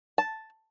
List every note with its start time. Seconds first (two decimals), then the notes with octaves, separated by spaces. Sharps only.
0.18 A5